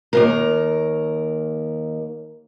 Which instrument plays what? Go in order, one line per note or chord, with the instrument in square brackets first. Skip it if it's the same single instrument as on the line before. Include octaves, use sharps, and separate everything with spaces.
[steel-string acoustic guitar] D#2 G#2 A#4